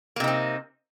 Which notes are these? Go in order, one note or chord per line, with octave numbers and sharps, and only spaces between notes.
C3 A#3 C4 D#4